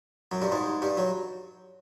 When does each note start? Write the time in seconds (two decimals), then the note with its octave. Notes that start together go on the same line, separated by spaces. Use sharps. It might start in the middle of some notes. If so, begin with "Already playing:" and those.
0.31 F#2 F#3
0.42 G2 G3
0.52 G#2 G#3
0.82 G2 G3
0.97 F#3